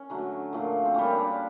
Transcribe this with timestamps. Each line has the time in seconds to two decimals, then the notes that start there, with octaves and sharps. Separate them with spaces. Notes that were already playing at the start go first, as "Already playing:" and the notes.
Already playing: C#4
0.10 D3 F#3 A3
0.53 A#2 F3 A3
0.85 C4
0.94 A#2 G3 C#4
1.16 D4